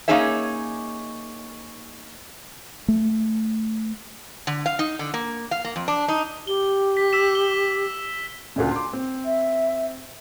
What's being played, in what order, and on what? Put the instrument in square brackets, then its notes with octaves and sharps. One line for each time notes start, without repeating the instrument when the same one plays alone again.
[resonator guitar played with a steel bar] A#3 C#4 D#4 G#4 C#5 E5
[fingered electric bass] A3
[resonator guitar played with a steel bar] D3
F5
D#4
D3
A#3
F5
A#3
F2
D4
D#4
[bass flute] G4 [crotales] G7
[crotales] B6
E6 B6 E7
G7
[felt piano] D2 A#2 C#3
C6 D6
C4
[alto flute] E5